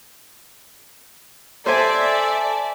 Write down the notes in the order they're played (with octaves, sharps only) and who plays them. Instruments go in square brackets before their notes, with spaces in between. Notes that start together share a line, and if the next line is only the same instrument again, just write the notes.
[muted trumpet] A4 [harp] C5 G#5 [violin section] D5 E5